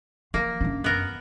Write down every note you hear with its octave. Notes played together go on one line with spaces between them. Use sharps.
F3 A#3
F#2 D4
B3 A#4